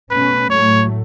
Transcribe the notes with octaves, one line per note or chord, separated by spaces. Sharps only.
B2 A3 C#4 B4
A2 F#3 A3 C#5